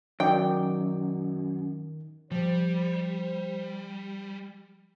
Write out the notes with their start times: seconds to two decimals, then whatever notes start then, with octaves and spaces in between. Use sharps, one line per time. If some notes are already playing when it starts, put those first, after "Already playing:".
0.20 F#2 D#3 F#3 D#4 D5 G5
2.32 F3 G3 C5